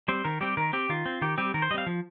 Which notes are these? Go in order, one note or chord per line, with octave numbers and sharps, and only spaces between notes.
G3 C4 C5
D#3 A#4
G3 C4 G4
D#3 A#4
C4 G4
D#3 F4
C4
D#3 G4
G3 C4 G4
D#3 A#4
C5
G3 C4 D#5 F5
F3